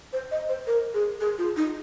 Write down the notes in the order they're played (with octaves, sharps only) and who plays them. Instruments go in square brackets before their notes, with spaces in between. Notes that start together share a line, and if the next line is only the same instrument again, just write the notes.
[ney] C5
D#5
C5
A#4
G#4
G#4
F4
D#4